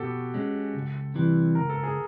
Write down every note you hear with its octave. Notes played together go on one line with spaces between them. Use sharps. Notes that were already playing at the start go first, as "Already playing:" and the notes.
Already playing: B2 F#4 G4 A4
G#3 C#4
C#2
C3 E3 G3
C#2 A#4
A4
G#4